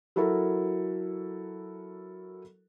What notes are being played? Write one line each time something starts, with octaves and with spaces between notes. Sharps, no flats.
F#3 E4 F#4 A4 A#4